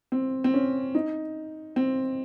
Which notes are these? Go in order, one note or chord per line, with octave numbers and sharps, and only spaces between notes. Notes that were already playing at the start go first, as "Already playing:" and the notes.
C4
C4
C#4
D#4
C4